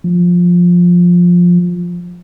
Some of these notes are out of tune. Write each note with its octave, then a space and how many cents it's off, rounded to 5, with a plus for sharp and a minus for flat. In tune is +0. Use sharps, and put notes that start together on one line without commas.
F3 +10